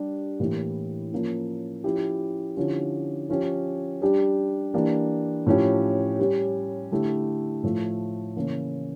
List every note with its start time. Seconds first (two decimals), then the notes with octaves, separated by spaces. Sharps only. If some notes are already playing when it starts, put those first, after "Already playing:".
Already playing: G3 D4 G4
0.40 A2 E3 A#3 E4 G4
1.12 F3 A#3 C#4
1.84 F3 C#4 E4 G4
2.57 D3 F3 C#4 E4 G4
3.29 F3 C#4 G4
4.02 G3 D4 G4
4.74 E3 A#3 D4 G4
5.46 A2 F3 C#4 G4
6.19 G3 C#4 G4
6.91 D3 A3 E4 G4
7.63 A2 F3 A3
8.36 C#3 E3 A#3 C#4